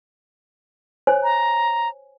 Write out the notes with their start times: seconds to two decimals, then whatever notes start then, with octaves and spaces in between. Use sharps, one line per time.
1.07 C5 C#5 G#5
1.23 A#5